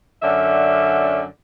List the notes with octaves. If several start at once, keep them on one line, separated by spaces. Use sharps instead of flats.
F#2 D3 C#4 D5 E5